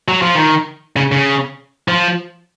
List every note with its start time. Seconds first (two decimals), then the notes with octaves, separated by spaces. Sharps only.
0.08 F#3
0.22 F3
0.35 D#3
0.96 C#3
1.12 C#3
1.88 F3